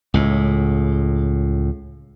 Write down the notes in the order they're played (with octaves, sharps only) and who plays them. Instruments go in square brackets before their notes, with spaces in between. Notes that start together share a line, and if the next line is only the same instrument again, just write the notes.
[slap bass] C#2 A2